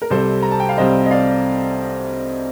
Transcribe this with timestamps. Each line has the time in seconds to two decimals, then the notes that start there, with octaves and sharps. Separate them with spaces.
0.02 A#4
0.10 C2 C3 G3 C4 A4 C5
0.43 A#5
0.51 A5
0.60 G5
0.69 F5
0.77 C2 C3 G3 C4 C5 D#5
1.06 D#5
1.11 D5 F5